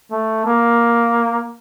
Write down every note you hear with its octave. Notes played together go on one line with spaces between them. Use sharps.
A3
A#3